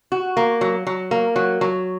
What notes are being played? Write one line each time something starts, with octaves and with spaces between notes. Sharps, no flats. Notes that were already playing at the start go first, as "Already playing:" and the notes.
F#4
A#3
F#3
F#3
A#3
F#3
F#3